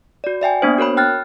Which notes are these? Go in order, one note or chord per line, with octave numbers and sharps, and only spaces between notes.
F#4 D5
D5 E5 G5 G#5
A#3 B3 D4 C5
F#4 A#4 C#5 B5
G5 F6 F#6 A6